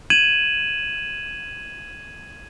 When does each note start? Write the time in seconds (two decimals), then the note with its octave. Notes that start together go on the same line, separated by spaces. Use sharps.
0.10 G#6 D#7 E7 F#7